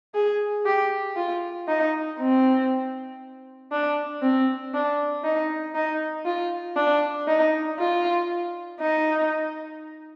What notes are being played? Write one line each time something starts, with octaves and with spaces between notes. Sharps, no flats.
G#4
G4
F4
D#4
C4
D4
C4
D4
D#4
D#4
F4
D4
D#4
F4
D#4